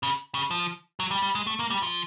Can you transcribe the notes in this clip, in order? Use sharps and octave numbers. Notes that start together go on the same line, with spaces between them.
C#3
C#3
F3
F#3
G3
G3
G#3
A3
A#3
G3
F3